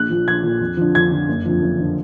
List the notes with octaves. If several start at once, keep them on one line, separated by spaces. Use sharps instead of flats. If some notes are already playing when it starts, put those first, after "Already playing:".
Already playing: A#1 F#6
A#2 F3
A#1 G#6
A#2 F3
F2
D3 F3
F2 G#6
D3 F3
F#1
F2 D3 F3
F#1
F2 D3 F3